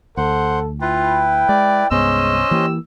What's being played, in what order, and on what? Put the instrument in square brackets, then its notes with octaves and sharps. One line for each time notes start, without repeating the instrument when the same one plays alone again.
[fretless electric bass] D2 [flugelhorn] A4 [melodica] C5 [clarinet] F#5
[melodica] E4 B4 [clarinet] F4 [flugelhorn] G5
[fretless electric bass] G#3 [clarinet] D5
[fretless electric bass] C2 G2 B3 [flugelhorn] G#3 [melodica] C#4 C5 D#5 [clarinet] E6
[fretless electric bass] E3 A#3 [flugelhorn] G4